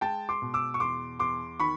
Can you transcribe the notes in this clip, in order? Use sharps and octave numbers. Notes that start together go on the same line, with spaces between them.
G#3 G5 A5
C6 D6
B2
D6 E6
C#6
E2 C6 D6
E2 C6 D6
D#3 B5 C#6